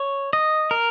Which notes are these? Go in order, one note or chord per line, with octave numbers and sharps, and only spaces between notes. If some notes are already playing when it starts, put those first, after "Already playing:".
Already playing: C#5
D#5
A#4